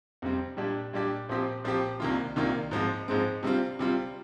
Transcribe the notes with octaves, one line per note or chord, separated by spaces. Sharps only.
F2 C3 G3 C4
A#2 G3 D4 G4
A#2 G3 D4 G4
A#2 F3 C4 G4
A#2 F3 C4 G4
C2 C3 D#3 A#3 F4
C2 C3 D#3 A#3 F4
G#2 F3 G#3 C4
G#2 F3 G#3 C4
C3 G3 C4 F4
C3 G3 C4 F4